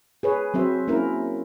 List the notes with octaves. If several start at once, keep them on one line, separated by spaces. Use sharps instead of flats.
G#4 B4 C#5
F#3 C4 C5 E5
A#3 C#4 E4 A#4